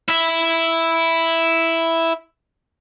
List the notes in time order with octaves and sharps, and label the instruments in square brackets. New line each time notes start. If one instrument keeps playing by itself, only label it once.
[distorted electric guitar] E4 E5